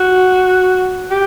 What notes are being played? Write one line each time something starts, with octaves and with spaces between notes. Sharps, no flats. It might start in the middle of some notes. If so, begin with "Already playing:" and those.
Already playing: F#4
G4